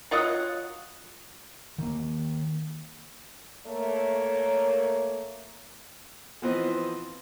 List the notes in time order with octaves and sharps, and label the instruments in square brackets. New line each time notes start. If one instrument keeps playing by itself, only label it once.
[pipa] F#3 F4 D#5 F#5
[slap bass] D#3 A#3
[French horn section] A3 A#3 C#5
[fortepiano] E3 F3 B3 C4 C5 D#5